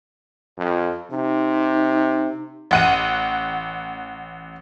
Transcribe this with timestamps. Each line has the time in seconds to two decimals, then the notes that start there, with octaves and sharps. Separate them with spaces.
0.58 F2
1.11 C3 D#4
2.71 A1 F#5 D#7